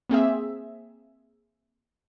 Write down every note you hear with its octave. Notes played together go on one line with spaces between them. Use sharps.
A#3 C4 G#4 E5